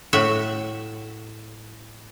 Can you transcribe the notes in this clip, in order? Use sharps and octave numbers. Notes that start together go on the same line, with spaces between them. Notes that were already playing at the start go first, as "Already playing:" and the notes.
A2 F#4 E5